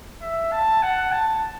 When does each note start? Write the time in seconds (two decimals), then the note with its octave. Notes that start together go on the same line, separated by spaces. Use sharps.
0.22 E5
0.52 A5
0.82 F#5
1.12 A5